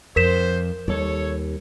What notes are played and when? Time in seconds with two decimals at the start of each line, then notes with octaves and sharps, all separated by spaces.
0.16 F2 A#4 C5 B6 E7
0.88 D#2 G3 A4 C#5